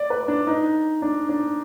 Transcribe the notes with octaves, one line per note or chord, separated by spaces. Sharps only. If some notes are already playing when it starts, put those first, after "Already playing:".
Already playing: D5
B4
D4
D#4
D4
D4